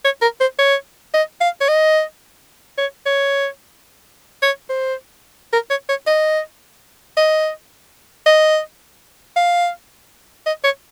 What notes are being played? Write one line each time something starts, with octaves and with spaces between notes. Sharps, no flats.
C#5
A#4
C5
C#5
D#5
F5
C#5
D#5
C#5
C#5
C#5
C5
A#4
C#5
C#5
D#5
D#5
D#5
F5
D#5
C#5